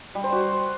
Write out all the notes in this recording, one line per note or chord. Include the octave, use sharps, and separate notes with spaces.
G3
C5
F#4